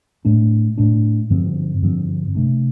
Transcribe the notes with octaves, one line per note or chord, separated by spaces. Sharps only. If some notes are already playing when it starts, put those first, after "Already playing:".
A2 A3 D4
A2 A3 D4
G2 D3 F3 C4
G2 D3 F3 C4
C3 A3 D4